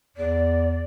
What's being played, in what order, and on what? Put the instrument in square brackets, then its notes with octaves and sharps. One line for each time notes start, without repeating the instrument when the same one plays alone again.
[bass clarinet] E2 [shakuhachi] D5